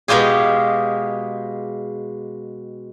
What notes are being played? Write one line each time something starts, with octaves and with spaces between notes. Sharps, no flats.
B2 G#3 F4 G4 G#4